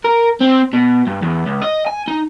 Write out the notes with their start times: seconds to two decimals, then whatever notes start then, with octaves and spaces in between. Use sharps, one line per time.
0.05 A#4
0.41 C4
0.73 B2
1.07 G2
1.22 E2
1.46 C#2
1.62 D#5
1.87 G#5
2.08 D#4